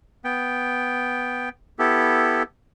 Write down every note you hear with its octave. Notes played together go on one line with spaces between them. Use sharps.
B3 G5
B3 E4 G4 A4